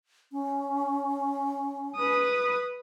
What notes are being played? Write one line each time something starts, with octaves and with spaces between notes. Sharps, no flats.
C#4
B4 D#6